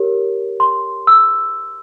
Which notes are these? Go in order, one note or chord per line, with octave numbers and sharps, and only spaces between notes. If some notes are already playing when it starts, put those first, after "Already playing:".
Already playing: G4 A#4 C#5
C6
E6